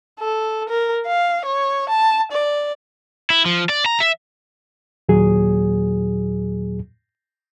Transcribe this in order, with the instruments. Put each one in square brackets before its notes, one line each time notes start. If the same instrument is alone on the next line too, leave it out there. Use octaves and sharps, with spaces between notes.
[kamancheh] A4
A#4
F5
C#5
A5
D5
[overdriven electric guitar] E4
F3
D5
A#5
E5
[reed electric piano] D#2 A#2 F#3 G#4